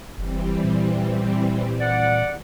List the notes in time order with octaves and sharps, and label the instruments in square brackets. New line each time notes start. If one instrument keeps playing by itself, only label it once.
[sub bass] F#1 [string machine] E3 G3 C4
[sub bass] A#2
[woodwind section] D5 F#5